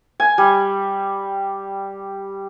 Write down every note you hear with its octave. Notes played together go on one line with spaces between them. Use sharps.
G#5
G3